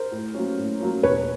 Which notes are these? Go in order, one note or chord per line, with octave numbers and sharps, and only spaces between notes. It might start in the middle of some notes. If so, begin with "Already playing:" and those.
Already playing: A#4 C5
A2
F#3 A#3 C#4
A2
F#3 A#3 C#4
E1 B4 C#5